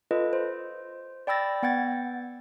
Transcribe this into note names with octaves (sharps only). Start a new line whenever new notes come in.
F4 A4 B4 D#5
C5
D5 G5 B5 E6 A6 A#6
B3 F#5 G5 G#6 A6